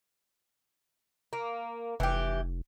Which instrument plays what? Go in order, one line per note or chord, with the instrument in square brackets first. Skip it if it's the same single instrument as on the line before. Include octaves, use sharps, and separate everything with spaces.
[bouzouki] A#3
[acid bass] F1 [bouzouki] E3 G4